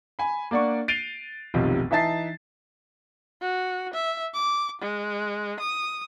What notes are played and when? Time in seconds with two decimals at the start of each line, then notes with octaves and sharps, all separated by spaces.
0.19 G#5 B5
0.51 A#3 D4 D5 F#5 C#6
0.88 A6 C7 D7 D#7 F7 G7
1.54 F1 B1 C3 D#3 F3
1.91 E3 D#4 E5 A5 A6 C7
3.42 F#4
3.94 E5
4.34 D6
4.82 G#3
5.60 D#6